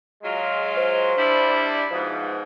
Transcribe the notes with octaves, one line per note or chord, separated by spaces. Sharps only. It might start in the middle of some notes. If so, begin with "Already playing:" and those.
F#3 G#3 F4
C5
G3 D4 E4
G#2 B2 F3